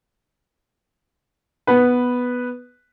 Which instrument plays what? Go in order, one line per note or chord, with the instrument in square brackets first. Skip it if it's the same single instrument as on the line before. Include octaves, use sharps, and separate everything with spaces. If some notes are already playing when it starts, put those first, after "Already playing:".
[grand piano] B3 B4